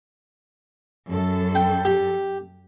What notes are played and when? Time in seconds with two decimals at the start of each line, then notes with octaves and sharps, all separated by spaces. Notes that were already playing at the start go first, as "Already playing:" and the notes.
1.09 F#2 A4
1.55 G5
1.85 G4